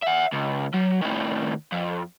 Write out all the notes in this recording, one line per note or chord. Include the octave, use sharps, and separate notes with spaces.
E5 F#5
C#2
F#3
A2 D#3
F2